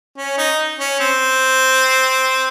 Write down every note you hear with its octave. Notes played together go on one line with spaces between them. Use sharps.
C#4
D#4
C#4
C4